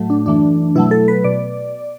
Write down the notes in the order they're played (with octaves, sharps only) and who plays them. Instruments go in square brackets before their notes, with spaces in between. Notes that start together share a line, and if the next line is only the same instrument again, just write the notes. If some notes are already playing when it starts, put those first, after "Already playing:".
Already playing: [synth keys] A2 F#3 A3
D4
F#2 E3 A3 D4
B2 F#3 A3 E4
A4
B4
B2 D5